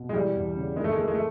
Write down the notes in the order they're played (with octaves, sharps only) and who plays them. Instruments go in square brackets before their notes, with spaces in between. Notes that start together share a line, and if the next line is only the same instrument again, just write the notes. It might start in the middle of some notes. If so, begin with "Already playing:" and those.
Already playing: [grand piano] B2
[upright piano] G#3
[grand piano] E3 [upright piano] G3
[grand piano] E2
C#3
[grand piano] D#3 [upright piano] G#3
[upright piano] A3
G#3
[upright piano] A3 [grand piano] A#3
[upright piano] G#3
A3